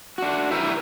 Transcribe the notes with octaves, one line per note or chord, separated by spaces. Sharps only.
D4 F#4
E4 G4 A#4 B4